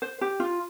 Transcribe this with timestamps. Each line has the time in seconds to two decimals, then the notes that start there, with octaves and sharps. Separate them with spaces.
0.02 C5
0.21 G4
0.40 F4